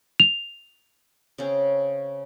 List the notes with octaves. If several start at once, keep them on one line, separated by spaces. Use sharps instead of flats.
F7
C#3 C4 C#4